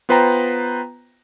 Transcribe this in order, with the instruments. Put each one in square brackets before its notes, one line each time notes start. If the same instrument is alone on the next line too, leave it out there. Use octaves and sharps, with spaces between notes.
[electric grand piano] B3 F4 B4 C5 G5 A#5